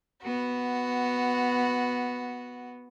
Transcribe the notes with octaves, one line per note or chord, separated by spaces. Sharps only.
B3 F#4